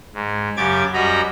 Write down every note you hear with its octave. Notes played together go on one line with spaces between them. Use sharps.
G#2
F#2 C#3 G4 D6 G#6 A6
F#2 G3 F#4 D#5 A#5 B5